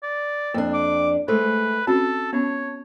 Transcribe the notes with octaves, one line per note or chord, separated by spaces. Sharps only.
D5
F2 A#3 D4
D6
G#3 A3 B4 C5
C4 C#4 F#4 A4 A5
B3 C#4 C#5